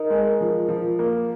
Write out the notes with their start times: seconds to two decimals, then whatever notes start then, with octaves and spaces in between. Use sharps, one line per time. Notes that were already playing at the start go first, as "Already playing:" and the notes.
Already playing: D#4 A#4
0.10 G#3
0.41 F3
0.69 F3
0.99 A#3